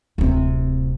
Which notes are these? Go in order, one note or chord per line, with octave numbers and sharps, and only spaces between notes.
D1 C3